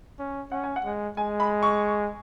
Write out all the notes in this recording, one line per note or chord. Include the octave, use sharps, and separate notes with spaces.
C#4
C#4 F#5
G#5
F#5
G#3
G#3 G#5
B5
C#6